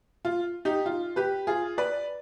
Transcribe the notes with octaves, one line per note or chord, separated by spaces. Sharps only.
F4
D#4 G4
F4
G4 B4
F4 G#4
B4 D5